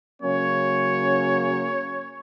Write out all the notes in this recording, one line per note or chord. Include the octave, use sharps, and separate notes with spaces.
C#3 F#3 A#3 C#4 C#5